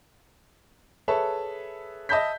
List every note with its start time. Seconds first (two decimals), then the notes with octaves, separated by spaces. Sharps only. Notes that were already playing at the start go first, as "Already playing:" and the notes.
1.08 G#4 A4 B4 C#5 E5 A5
2.09 D#5 E5 A5 B5 G6 B6